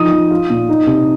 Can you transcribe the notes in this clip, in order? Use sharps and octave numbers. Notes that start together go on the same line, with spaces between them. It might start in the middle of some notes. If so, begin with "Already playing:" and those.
Already playing: F3 D#4 D#6
F3
F4
A#2
D#4
C3